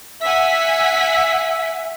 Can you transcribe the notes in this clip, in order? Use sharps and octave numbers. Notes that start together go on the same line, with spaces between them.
E5 F#5 G#5 B6